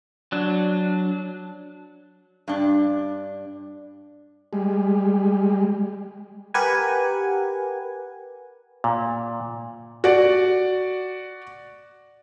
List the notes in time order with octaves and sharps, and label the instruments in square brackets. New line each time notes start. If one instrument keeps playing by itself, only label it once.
[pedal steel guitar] F#3 D4
[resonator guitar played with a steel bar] G2 D4
[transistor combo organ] G3 G#3
[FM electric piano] G4 A#4 B4 F#5 G#5
[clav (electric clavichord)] A#2
[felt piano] F#4 D5